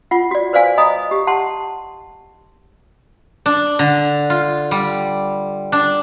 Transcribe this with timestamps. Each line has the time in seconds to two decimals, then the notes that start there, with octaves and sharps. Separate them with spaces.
0.11 F4 F#5
0.31 F#4 D5
0.53 B4 C5 D5 F5 G#5
0.78 D#5 A#5 B5 D#6
1.11 G4
1.27 F#5 A5 C6
3.46 D4
3.79 D3
4.30 F4
4.71 G3
5.72 D4